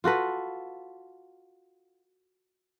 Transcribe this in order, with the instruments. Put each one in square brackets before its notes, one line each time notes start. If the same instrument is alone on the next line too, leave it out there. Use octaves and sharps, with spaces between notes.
[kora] F4 F#4 A4 B4